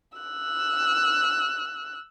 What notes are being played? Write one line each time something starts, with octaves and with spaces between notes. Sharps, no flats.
E6 F#6